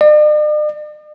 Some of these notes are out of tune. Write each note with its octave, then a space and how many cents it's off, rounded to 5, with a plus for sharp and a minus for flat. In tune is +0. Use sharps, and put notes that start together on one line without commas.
D5 +45